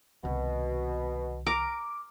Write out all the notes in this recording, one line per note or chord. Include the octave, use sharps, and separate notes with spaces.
C2 B2 D#3
A#4 D6